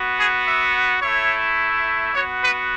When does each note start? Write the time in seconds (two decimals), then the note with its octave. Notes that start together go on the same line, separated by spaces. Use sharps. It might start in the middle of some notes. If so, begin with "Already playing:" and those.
Already playing: B3 F#4
0.18 G#4
0.46 E5
1.01 A3 E4 C#5
2.13 B3 F#4 C#5
2.42 B4